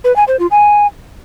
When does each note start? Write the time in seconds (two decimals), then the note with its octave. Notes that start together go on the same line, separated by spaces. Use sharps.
0.04 B4
0.16 G#5
0.28 C5
0.39 F4
0.51 G#5